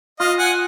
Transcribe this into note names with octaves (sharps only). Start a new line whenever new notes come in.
F4 D#5 F5
F#5 G#5